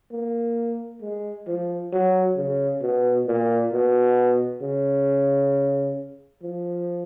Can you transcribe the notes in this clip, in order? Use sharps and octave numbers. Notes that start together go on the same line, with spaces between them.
A#3
G#3
F3
F#3
C#3
B2
A#2
B2
C#3
F3